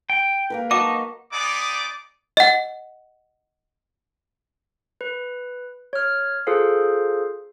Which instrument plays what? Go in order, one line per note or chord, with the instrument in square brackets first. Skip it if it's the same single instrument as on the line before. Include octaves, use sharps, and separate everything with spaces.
[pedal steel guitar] G5
[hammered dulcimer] A#3 A#4 B4
[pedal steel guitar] D#4 D#5 A5 [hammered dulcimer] F#4 [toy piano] D6
[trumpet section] B3 D#4 G#4 D5 D6
[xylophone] D#5 F#5
[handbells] B4
C#5 F6
F4 G#4 A4 C5 F5